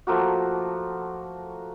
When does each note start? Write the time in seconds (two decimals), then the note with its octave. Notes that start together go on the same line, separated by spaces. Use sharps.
0.07 F3 A3 A#3 F#4